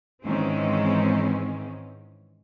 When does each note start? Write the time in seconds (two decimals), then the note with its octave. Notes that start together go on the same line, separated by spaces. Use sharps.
0.24 G#2 D#3 E3 G#3 C4 C#4